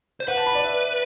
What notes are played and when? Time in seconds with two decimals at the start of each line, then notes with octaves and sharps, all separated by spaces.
0.20 C5
0.28 B4 F#5
0.37 A5
0.46 B5
0.55 D5
0.65 E5